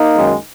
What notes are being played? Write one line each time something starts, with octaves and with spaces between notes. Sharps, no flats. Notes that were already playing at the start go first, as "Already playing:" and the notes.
Already playing: A#3 D#4
F#2 D#3 G#3